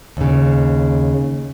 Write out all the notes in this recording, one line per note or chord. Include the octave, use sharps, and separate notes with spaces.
D#2 C#3